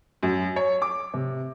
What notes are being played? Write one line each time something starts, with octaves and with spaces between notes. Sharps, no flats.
F#2
C#5
D6
C3